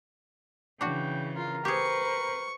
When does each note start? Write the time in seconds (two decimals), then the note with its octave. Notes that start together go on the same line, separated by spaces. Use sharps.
0.81 C#3 E3 D4 F#4 G5
1.36 F4 A#4
1.65 G4 G#4 B4 C5 C#6